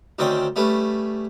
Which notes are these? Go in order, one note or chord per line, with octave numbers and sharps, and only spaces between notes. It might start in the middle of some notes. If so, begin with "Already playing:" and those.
D2 D#3 C4 C#4 D5 G5
G3 A3 C#4 B4